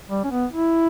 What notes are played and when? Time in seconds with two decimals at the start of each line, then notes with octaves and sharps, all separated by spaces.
0.10 G3
0.24 C#4
0.30 B3
0.52 E4